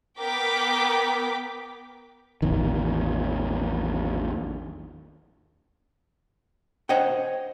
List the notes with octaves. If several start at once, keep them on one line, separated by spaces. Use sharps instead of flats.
B3 A#4 G5 D6 B6
A1 E2 D#3
C5 C#5 D#5 F#5 G5